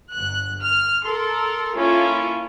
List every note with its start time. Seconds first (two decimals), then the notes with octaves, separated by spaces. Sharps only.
0.12 G1 F#6
0.61 F6
1.06 A4 A#4 C6
1.75 A#3 C#4 E4 F4 A4